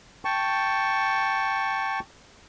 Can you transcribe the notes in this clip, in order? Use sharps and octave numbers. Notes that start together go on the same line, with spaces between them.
G5 A5 C#6